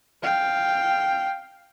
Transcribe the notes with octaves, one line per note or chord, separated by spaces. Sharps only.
F5 G5